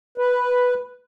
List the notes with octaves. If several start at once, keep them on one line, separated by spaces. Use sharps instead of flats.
B4